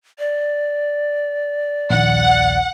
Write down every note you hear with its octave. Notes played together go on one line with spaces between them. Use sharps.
D5
A#1 D#2 F#5